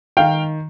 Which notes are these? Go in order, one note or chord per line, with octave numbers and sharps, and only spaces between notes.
D#3 F5 G5